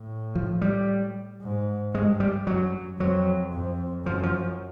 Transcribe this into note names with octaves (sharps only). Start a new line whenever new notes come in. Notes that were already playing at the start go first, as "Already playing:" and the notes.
Already playing: A2
F3
G3
G#2
G2 G#3
G3
F#2 F#3
F2 F#3
F2
F#2 F3
F3